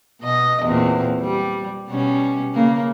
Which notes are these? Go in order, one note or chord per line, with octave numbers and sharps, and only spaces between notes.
B2 D#5
E2 A#2 C4
G3
B2 G3 C#4
C#3 A#3